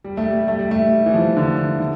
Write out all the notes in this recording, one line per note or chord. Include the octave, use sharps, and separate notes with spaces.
G3
A3
G3
A3
G3
A3
G3
E3
F3
D3
D3
D3